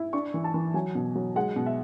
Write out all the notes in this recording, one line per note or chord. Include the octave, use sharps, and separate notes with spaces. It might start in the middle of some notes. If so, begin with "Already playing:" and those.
Already playing: E4
D4 C#6
E3
A5
E3
F#3 G#5
B2
F#3
G#3 F#5
B2
E5